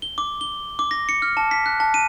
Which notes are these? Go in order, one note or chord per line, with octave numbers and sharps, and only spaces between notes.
G7
D6
G7
D6
A#6
C#7
F6
A5
B6
F#6
A5
D#7